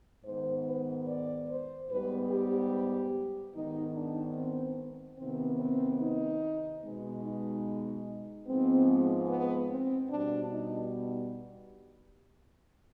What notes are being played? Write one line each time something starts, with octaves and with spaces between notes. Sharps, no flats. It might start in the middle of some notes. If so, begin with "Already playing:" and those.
G#2 D#3 B3 C5
B4
D5
C5
G#2 G3 B3 B4
G4
G#2 D#3 B3 D#4
D4
C4
C3 D#3 B3 C4
C4
D#4
B2 G#3 B3
D#4
G#2 F3 G#3 B3 C4
B3
C4
B2 G3 B3 D4
D#4